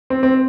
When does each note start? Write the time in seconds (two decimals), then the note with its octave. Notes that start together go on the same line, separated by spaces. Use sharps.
0.10 C4
0.23 C4